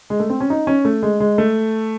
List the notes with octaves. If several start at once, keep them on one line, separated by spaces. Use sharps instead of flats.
G#3
A3
C4
C#4
D#4
C#4
A3
G#3
G#3
A3